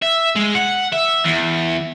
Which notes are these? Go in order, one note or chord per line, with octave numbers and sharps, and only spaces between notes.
E5
G#3
F#5
E5
E2